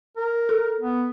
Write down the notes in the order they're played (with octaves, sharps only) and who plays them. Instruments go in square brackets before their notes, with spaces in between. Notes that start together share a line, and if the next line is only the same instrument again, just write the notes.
[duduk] A#4
[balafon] A4
[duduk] B3